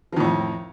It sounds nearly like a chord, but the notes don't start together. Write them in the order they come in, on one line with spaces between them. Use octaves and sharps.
F3 D#3 A2 F2